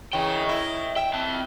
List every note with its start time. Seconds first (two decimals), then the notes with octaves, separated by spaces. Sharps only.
0.13 C#3 E3 D#5 G5
0.49 E4
0.96 E5 G5
1.14 C4 A5